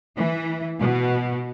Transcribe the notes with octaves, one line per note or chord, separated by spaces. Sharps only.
E3
B2